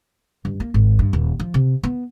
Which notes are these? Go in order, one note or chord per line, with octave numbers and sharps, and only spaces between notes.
G2
A#3
G#1
G2
D#1
F3
C3
B3